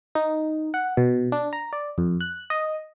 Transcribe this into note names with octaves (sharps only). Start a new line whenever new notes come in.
D#4
F#5
B2
D4
A#5
D5
F2
F#6
D#5